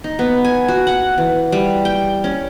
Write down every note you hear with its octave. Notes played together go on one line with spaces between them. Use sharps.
D#4
B3
G#5
F#4
F#5
E3
G3
G5
C#4